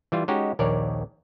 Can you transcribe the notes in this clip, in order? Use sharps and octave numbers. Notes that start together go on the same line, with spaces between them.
E3 G3 F4
G#3 C#4 D#4 F#4 G4
A#1 D#2 A#4 C#5 D5